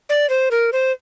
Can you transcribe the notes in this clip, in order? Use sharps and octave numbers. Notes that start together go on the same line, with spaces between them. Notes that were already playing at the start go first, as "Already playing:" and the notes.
D5
C5
A#4
C5